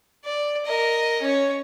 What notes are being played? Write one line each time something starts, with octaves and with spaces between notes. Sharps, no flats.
D5
A#4 D#5
C#4 C#5